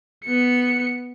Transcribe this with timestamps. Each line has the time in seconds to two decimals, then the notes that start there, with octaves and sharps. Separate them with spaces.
0.25 B3 C#7